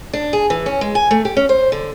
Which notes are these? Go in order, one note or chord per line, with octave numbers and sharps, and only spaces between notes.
D4
G#4
E3
C#4
G#3
G#5
A3
G4
C#4
C5
D3